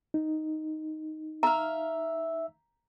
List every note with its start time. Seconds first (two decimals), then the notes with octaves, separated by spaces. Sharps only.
0.14 D#4
1.43 E5 F5 A#5